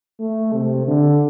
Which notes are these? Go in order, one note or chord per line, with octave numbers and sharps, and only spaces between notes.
A3
C3
D3